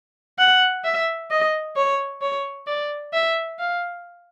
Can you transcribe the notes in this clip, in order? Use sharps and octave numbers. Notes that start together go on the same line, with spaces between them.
F#5
E5
D#5
C#5
C#5
D5
E5
F5